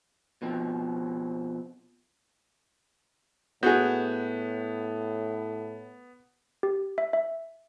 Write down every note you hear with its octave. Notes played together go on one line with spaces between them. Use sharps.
B2 F3 C4
A2 B3 F#4 G#4 G6
G4
E5
E5